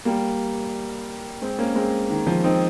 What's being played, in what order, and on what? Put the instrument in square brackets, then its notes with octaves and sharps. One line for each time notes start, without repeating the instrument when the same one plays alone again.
[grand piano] G3 A#3
G#3 C4
A#3 C#4
G#3 C4
D#3
F3
C4 D#4